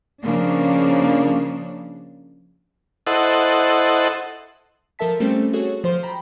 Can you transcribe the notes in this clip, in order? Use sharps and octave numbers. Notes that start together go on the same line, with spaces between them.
C#3 F3 A#3 D4
E4 A4 C5 D#5 F#5
F3 A4 A#4 E5 A5 B6
G3 A3 C4 C#4 A4 C5
F#4 G#4 A4 C#5
F3 C5 C6
G5 A#5 B5